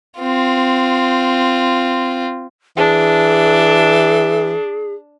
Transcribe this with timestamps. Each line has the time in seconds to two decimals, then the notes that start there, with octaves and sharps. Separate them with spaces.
0.20 C4 F4
2.77 E3 D4 G#4